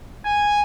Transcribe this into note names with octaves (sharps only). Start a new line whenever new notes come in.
G#5